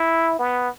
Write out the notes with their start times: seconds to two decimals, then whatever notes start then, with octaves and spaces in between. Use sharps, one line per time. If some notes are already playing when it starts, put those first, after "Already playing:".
Already playing: E4
0.39 B3